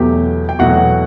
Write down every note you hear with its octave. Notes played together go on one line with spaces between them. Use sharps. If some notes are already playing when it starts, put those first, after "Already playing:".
Already playing: E2 B2 F#3 A3 G4 G5
G5
E2 B2 F#3 A3 F#4 F#5